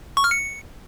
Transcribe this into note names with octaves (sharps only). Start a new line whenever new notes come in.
C#6
F6
C#7